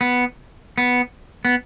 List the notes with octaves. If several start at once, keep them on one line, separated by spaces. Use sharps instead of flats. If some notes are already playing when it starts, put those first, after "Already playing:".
B3
B3
B3